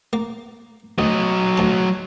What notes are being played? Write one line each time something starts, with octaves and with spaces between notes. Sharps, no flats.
A#3
D2 F#3 D#5
D2 A5